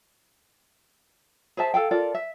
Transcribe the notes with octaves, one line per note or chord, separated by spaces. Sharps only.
G#4 C5 E5 A5
G#4 A4 F5 G5
F4 A4 A#4 D5
E5